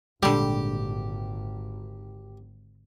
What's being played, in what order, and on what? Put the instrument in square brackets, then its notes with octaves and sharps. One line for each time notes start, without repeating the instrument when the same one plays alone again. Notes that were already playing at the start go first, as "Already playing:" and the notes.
[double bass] G#1 [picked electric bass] A#2 G#3 [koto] D3 G3 [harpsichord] G4